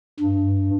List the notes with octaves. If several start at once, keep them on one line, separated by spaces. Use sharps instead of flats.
G2